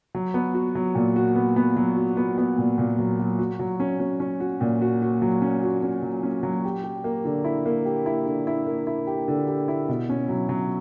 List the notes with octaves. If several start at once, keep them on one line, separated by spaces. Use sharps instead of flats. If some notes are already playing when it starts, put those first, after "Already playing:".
F#3
B3
F#4
F#3
A#2
F#4
B3
B3
F#3
F#4
B3
B3
A#2
A#2
F#3
F#3
F#4
F#3
C#4
C#4
C#4
F#4
A#2
F#4
F#4
F#3
C#4
F#4
C#4
F#3
C#4
F#3
G4
G4
A#3
D3
E4
A#3
G4
E4
D3
E4
A#3
E4
G4
D3
G4
E4
B2
C#4
F#3
F#3